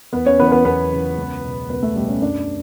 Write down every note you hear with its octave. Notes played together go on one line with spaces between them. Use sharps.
E2 B3 B4
C#4 C#5
C#3 E3 B3 B4
C#5
B3 B4
E2 B3 B4
C#3 E3
C#2
B2
C#2 B3 B4
A3 A4
B2 G3 G4
C#4
F#2 D4